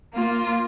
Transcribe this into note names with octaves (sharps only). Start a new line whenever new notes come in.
A#3 F4